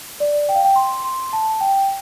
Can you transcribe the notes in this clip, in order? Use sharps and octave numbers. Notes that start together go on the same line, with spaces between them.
D5
G5
F5
G5
C6
C6
A5
G5